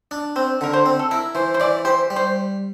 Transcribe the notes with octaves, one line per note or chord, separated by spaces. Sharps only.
D4
C4 C5
D3 A#4
C5
C4
A4
E4 A#4
E3 C5
C5
E3 D5
G4 C5
G3
C5